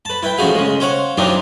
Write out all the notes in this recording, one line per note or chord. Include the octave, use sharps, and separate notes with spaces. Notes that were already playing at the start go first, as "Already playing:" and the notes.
B4 A5
E4 B4 G5
A1 C#3 F3 F#4 G#4 F5
C#3 G#3
C5 C#5 F5 F#5
E3 F#3 C4 D4 D#4 F4